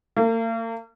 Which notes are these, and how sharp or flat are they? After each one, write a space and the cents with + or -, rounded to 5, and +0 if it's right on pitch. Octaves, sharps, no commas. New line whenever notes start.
A#3 -45